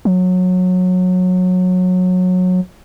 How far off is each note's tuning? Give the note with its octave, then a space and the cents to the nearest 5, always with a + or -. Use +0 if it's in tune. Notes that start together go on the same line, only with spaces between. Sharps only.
F#3 -20